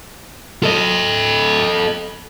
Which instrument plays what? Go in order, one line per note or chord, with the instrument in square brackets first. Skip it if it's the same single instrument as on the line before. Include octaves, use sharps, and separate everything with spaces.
[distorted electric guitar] A4 D#5